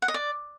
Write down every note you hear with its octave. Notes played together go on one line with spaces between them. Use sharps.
F#5
D#5
D5